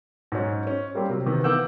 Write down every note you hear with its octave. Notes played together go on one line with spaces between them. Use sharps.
G#2 F#3 C#4
C#4
G3 A#3 C4 G4
C3 F#3
C3 D#3 E3 B3
E3 A#3 F#5 D6 E6 G6